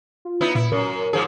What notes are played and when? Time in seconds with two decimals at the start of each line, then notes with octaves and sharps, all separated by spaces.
0.25 F4
0.41 B3 D#4 E4
0.55 A#2 E4
0.72 F#2 A#4
1.13 G#2 F3 G#4